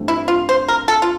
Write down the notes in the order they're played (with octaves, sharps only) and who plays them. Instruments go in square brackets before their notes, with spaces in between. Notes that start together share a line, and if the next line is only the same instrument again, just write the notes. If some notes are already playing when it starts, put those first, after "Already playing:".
Already playing: [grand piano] G2 E3 A3 C4
[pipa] E4
F4
C5
A#4
A4
F4